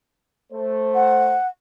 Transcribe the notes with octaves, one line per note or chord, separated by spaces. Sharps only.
A3 C5
F#5